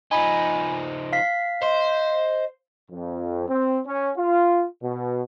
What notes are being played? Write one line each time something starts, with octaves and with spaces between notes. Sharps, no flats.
F3 D#4 G#5 B5
F5 B6
C5 D#5 C6
F2
C4
C#4
F4
B2